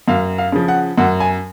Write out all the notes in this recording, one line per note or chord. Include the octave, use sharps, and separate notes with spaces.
F#2 F5
F5
C#3 F3
F#5
F#2 F#5
G#5